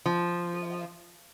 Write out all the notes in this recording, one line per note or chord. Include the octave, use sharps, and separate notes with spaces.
F3